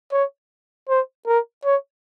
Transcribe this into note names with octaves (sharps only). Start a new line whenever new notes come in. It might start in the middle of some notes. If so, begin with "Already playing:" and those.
C#5
C5
A#4
C#5